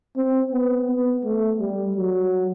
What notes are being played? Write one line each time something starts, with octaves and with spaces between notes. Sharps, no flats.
C4
B3
B3
A3
G3
F#3